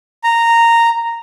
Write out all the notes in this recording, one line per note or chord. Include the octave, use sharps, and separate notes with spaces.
A#5